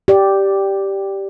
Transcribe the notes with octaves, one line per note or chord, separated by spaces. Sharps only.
G4 D5